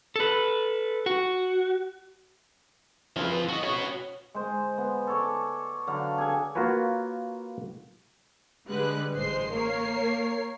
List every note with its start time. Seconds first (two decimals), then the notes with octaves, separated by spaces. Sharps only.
0.16 A4 B4
1.06 F#4
3.16 F3 C4 F4 G#4 B4
3.49 F#4 D#5
3.63 B3 F#4 C#5
3.78 C#4
4.35 G#3 C5
4.78 B3
5.07 A4 C#5 D5
5.87 D3 F#3 D4 F5
6.18 G#4 A4 G#5
6.55 A#3 F4 F#4 A#4 B4 C#5
8.70 D3 G3 G#3 B4 F#6
9.15 A1 G#3 C5 C6 C7
9.53 A#3 A#4 C#5 C7